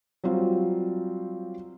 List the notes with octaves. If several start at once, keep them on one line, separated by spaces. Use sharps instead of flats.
F#3 G3 C4 F4